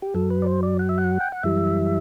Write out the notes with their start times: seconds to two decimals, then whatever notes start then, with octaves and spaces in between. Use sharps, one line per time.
0.02 G4
0.15 F#2 F#3 A4
0.30 B4
0.42 D5
0.46 C5
0.63 D5
0.79 F#5
0.89 E5
0.98 F#5
1.20 G5
1.32 F#5
1.43 F#2 E3 G3 E5